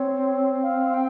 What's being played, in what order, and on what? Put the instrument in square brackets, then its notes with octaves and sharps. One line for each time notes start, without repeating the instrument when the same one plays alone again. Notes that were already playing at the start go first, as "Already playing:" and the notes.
Already playing: [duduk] C4 [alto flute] C#5
[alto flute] F5
G5